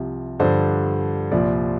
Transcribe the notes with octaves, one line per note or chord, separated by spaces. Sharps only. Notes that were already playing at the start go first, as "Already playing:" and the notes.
Already playing: C2 C3 F3
G2 D3 F3 C5
C2 A#2 F3 D5